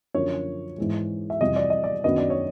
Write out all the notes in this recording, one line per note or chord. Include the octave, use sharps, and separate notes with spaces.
F#2 D3 F3 A#3 C#5
G#2 E3 G#3
E5
F2 C3 E3 G3 D#5
D5
D#5
D5
F#2 D#3 F#3 B3 D4 D#5
D5
C#5